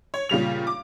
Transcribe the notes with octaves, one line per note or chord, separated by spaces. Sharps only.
C#5
A#2 C#3 G3 F7
D6